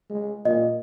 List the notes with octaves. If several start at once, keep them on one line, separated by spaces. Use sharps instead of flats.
G#3
A#2 D#5